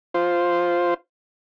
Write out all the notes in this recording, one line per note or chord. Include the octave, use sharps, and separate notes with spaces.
F4 C5